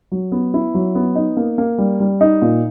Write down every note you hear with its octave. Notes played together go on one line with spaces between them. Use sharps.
F#3
B3
E4
F#3
B3
D#4
A#3
A#3
G3
G3
D#4
A#2